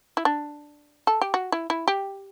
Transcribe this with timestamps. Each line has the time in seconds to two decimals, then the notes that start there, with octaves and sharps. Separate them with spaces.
0.17 E4
0.25 D4
1.07 A4
1.21 G4
1.34 F#4
1.52 E4
1.70 E4
1.88 G4